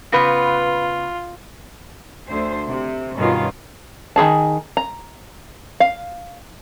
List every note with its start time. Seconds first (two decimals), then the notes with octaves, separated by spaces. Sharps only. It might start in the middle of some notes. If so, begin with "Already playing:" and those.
0.12 C#3 B3 F4 B4
2.27 D2 D3 C5
2.67 C3
3.17 G2 B2 D#3 C#4 F4 F5
4.16 D#3 E3 G#4 A5
4.77 A#5
5.80 F5